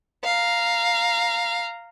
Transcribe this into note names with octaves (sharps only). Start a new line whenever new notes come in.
F5 A#5